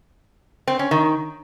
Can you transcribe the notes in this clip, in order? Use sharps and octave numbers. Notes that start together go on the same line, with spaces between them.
C4
C#4
D#3